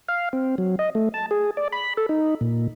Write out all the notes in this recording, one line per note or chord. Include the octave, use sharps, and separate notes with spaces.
F5
C4
F#3
D#5
A3
A5
G#4
D5
B5
A4
D#4
A#2